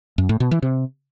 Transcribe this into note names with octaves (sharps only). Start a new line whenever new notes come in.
F#2
A2
B2
E3
C3